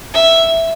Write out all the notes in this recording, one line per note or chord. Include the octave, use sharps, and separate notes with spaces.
E5